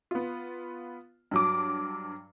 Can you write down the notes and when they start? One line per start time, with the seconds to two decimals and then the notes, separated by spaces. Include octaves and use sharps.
0.11 B3 F4
1.31 G2 F#3 D6